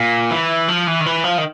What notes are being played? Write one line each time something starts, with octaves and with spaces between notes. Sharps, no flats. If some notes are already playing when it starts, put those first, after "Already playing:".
Already playing: A#2
E3
F3
E3
D#3
E3
F3
D#3